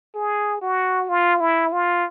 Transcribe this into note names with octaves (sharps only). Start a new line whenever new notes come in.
G#4
F#4
F4
E4
F4